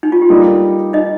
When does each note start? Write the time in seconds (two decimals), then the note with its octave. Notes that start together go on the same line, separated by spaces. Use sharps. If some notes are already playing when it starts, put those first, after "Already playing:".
0.03 D#4
0.12 F4
0.22 G4
0.30 G3 A#3 D#4 A4
0.93 D#4 D#5